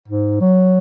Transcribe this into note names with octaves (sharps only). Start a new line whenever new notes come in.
G#2
F#3